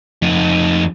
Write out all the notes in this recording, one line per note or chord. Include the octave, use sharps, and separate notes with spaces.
F2 D#4